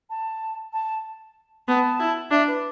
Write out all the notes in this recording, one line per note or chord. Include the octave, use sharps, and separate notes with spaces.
A5
A5
B3 A5
E4
D4 E5
B4